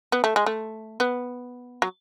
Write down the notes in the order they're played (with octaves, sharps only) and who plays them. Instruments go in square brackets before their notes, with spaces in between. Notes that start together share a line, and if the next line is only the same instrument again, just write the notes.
[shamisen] B3
A3
G#3
A3
B3
F#3